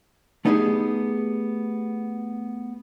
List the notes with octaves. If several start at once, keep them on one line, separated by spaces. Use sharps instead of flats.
A3 B3 D#4 F4 G4 G#4